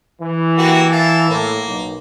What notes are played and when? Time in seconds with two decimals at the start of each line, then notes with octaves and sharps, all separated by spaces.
0.21 E3
0.58 A#3 F#4 G4
0.92 E5 F5 A5
1.30 A2 A#3
1.67 B1